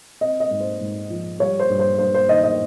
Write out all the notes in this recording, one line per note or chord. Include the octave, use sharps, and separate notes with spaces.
C4 D#5
D#5
G#2
C5
G#2
F3
G3 C#5
C5
G2
C5
G2 C5
C5
D#3 D#5
D#5